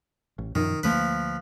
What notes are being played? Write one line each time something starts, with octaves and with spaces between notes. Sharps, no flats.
A1
F#2 A#2 D#3 F3
D2 F3 A3 A#3 B4